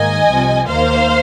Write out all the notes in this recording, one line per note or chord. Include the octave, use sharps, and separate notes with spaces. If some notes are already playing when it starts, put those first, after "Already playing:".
Already playing: G#2 D#3 A#3 D#5 G#5
C2 C3 F3
D#2 D#3 A#3 C5 F5